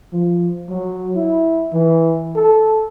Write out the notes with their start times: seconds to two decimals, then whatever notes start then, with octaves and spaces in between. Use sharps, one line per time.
0.13 F3
0.70 F#3
1.16 E4
1.73 E3
2.36 A4